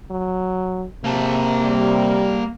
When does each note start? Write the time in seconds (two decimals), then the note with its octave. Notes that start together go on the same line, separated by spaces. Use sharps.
0.11 F#3
1.04 C3 A#3 A5
1.61 G3